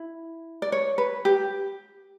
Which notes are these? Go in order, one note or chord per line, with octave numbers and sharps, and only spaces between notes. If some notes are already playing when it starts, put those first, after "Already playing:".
Already playing: E4
D5
C#5
B4
G4